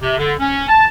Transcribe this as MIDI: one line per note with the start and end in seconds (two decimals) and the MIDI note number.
0.02 0.14 48
0.18 0.33 50
0.39 0.68 61
0.69 0.88 81